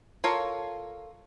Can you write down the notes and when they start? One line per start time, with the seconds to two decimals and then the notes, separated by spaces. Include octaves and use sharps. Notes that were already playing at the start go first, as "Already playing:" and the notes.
0.24 F4 A4 A#4 C#5 F5